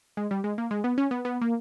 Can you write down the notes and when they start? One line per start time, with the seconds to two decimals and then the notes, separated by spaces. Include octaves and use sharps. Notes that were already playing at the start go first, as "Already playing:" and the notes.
0.17 G#3
0.31 G3
0.44 G#3
0.58 A#3
0.71 G#3
0.84 B3
0.98 C#4
1.11 B3
1.25 B3
1.41 A#3